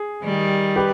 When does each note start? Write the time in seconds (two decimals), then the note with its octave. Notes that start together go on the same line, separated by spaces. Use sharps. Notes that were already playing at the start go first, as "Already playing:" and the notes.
Already playing: G#4
0.23 D#3 G3
0.76 G4 B4